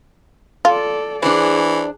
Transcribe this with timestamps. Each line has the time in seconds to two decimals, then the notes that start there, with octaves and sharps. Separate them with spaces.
0.65 F4 A4 D5
1.22 E3 D4 G#4 C5